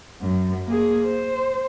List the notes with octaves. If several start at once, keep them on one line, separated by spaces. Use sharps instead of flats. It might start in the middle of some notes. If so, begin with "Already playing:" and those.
F#2
A#3 G#4
C5